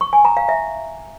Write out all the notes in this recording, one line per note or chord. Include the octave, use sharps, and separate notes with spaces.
C#6
G#5
A#5
F5
E5